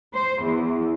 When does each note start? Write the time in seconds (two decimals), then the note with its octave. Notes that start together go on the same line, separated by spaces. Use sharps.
0.14 C5
0.44 E2